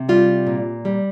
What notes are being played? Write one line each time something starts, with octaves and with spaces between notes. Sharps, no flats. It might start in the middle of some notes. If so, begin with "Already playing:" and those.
Already playing: C3
G3 F4
A#2
G3